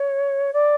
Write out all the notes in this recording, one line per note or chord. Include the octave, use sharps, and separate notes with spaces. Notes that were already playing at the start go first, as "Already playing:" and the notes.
Already playing: C#5
D5